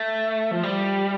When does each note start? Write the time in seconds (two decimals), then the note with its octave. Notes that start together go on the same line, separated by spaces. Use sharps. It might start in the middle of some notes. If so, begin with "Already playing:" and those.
Already playing: A3
0.51 F3
0.63 G3